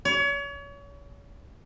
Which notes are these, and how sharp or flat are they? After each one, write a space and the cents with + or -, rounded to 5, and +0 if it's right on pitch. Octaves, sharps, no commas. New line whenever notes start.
C#5 +35